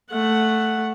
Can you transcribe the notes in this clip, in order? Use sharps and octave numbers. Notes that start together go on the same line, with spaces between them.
A3 F#5